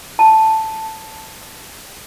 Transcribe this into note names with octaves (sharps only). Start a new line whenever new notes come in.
A5